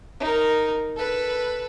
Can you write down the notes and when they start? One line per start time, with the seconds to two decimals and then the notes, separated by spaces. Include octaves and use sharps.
0.20 D#4 A#4
0.97 A4 B4